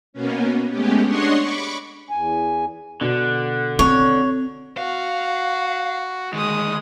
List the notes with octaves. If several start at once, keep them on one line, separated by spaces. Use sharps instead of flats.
B2 A#3 B3 C#4
G#3 A3 B3 C#4 G4
D4 C#5 D#5 F#5 C6 C#6
B5 C#6 D6
E2 G#5
B2 D3
C4 C#5
F#4 F5
D2 D#3 G#3 D#6